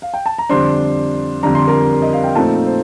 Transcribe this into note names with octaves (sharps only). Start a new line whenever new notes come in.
F5
G5
A5
A#5
F2 D3 G3 D4 C5 C6
F2 D3 G3 D4 A#5
C6
A#4 A#5
D#5
F5
G5
A#2 F3 A3 C4 D#4 A4 A5
C5